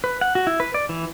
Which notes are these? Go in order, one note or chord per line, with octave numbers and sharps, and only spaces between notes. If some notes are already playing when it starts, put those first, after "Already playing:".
B4
F#5
F#4
E4
B4
D5
E3